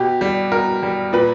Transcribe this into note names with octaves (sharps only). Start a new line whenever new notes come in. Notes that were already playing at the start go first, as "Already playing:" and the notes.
Already playing: B2 G4
G3
B2 A#4
G3
A#2 B4